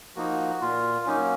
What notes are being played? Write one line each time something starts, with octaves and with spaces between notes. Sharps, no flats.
F3 A#3 D#4 F#4
A#2 F4
F#3 A#3 C#4 D#4